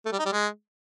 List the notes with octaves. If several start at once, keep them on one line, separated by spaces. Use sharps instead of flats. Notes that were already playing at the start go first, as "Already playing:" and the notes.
A3
G3
D#4
G3
G#3